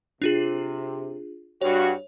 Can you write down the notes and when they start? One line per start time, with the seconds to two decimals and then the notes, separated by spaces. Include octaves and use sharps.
0.22 C3 D4 F4 G#4
1.62 G2 F#4 C#5